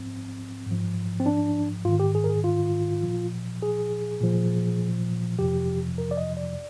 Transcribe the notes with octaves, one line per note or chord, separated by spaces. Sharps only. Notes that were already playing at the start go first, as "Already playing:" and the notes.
Already playing: G#2 F3 C4
G#2 F3
C4
D4
G#2 D#3 F4
G4
G#4
A#4
G#4
F4
A#2 F3
G#4
A#2 F3
F2 C3 F3 G4
A#4
D5
D#5
D5